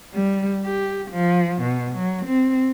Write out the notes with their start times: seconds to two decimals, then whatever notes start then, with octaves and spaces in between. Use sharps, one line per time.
0.14 G3
0.64 G4
1.11 F3
1.62 B2
1.96 F#3
2.26 C4